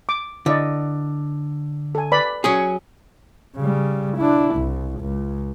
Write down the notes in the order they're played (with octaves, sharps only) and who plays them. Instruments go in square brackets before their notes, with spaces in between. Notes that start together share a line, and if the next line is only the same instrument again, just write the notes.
[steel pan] D6
[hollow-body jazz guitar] D3 [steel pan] E4 D5 D#5
[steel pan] A4 G#5
B4 D5 B5
[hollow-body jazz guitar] F#3 C#4 G#4
[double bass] C#3 G3
D4 E4
C2
C#2